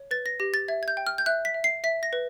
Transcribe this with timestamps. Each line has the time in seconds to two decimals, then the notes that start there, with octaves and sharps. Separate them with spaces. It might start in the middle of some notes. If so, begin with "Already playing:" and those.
Already playing: C#5
0.11 B4 A6
0.26 A#6
0.40 G4 A#6
0.54 A6
0.68 E5 G#6
0.83 G#6
0.88 G6
0.97 G5
1.07 F6
1.18 G6
1.26 E5 F#6
1.45 B6
1.54 E5
1.64 C7
1.84 E5 B6
2.03 A#6
2.13 B4